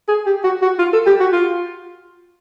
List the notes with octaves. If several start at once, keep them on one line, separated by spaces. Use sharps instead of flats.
G#4
G4
F#4
F#4
F4
A4
G4
F#4
F4